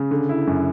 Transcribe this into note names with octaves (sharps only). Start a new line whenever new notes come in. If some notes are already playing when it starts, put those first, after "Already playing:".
Already playing: C#3
D3
E4
F#2